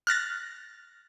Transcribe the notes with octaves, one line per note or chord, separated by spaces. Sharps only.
F6 F#6 A6 A#6